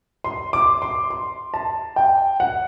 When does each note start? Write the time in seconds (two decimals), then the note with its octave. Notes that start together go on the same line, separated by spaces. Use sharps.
0.24 C6
0.53 D6
0.82 C6
1.10 C6
1.54 A5
1.96 G5
2.40 F#5